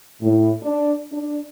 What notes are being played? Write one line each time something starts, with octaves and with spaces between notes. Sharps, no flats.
A2
D4
D4